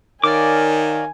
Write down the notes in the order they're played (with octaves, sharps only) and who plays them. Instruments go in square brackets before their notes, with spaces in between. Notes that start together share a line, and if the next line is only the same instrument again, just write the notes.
[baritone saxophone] D#3 [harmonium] A#4 C#5 F5 [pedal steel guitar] D5 D6 [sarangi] G#5